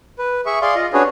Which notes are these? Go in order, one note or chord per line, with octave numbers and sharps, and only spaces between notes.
B4
G#4 E5 C#6
G#4 D5 F5 C6
F4 D#5
C#4 D4 F#4 G#4 B4 C#5